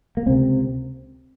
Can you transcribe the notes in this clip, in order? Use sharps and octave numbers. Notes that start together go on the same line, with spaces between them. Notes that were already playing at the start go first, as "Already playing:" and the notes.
A#3
C#2 C3 C4